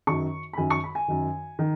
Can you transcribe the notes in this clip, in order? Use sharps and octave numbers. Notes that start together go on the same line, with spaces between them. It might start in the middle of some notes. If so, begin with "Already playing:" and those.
F#2 D#3 C#6
B5
F#2 D#3 G#5
C#6
B5
G#5
F#2 D#3
D#3